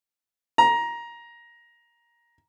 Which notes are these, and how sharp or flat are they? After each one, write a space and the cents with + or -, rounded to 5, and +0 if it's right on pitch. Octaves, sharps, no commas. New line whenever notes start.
A#5 +15